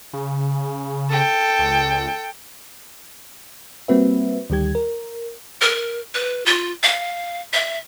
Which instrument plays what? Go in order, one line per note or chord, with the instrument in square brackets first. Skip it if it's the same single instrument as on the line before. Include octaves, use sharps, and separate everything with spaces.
[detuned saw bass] C#3
[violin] A4 G5
[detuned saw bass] C#2
[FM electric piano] G3 A#3 C4 F#4 B4 E5
D2 D#3 G3 G4 G#6
A#4
[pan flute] A#4
B4
F4
F5
E5